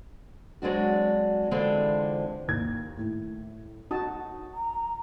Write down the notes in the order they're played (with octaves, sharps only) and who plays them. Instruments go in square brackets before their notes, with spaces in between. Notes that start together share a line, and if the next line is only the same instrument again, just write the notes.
[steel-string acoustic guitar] F#3 G#3 C4 D4 F#4
D3 E3 F3 G#3 C4 D4
[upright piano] D#2 G#6
A2
[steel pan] D#4 F#4 A5 [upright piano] D#6
[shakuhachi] A#5